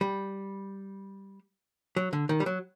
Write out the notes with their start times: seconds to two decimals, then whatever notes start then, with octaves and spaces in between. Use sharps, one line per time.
0.01 G3
1.96 F#3
2.13 D3
2.29 D#3
2.40 G3
2.46 F#3